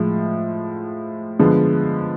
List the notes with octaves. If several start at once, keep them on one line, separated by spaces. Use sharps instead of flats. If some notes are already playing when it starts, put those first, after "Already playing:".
Already playing: A2 F3 G#3
D3 F3 G#3 B3